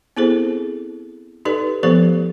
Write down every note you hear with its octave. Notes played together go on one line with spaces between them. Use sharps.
B3 C4 E4 G#4 A4 C5
D#4 G4 A4 B4 D5
F3 A3 B3 G4 A4 C5